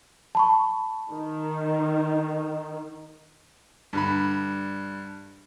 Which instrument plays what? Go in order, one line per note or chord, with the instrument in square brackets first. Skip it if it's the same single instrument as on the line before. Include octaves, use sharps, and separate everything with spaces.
[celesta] A5 B5 C#6
[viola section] D#3
[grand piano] G2 D3 B5